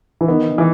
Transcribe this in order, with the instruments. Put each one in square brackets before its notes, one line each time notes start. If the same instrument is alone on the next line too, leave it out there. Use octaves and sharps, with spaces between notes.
[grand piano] E3
[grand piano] D#3 [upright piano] B3
[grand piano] D#3
[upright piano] E3